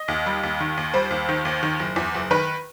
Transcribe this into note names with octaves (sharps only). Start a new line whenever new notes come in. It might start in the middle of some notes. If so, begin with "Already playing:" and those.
Already playing: D#5
D#2
G3
D#2
D#3
D#2
G3 C5
D#2
D#3
D#2
D#3
F#1
E2
F#1
D#3 B4